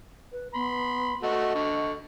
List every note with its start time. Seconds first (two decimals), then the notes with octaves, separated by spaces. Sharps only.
0.32 B4
0.54 B3 B5 C6
1.23 A3 F#4 D#5
1.55 D3 C#6